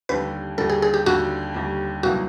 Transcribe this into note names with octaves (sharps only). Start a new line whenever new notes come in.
D#2 D3 G3 B4
D#2 D3 G3 A4
G#4
G#4
G4
D#2 D3 G3 F#4
D#2 D3 G3
C2 B2 F#3 A#3 D#4 F#4